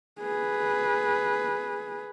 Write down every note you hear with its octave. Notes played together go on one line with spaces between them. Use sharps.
G#4 B4